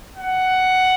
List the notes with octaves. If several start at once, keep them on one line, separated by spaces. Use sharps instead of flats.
F#5